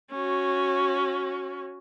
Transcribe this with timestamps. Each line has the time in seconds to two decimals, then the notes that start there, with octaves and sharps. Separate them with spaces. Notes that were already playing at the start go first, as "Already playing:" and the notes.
0.11 C#4 F#4